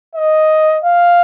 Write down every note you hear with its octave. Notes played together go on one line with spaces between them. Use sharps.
D#5
F5